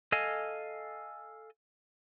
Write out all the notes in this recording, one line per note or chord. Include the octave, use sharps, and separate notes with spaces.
A4 D#5 F5 G#5